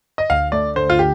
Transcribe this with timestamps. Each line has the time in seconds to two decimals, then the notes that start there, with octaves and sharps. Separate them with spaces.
0.18 D#5
0.30 D2 F5
0.52 A3 D5
0.76 D3 C5
0.90 F4
0.99 G4